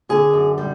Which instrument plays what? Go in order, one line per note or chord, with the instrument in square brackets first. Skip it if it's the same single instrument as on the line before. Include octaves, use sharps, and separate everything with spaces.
[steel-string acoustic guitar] D3 G#4
F#2
G3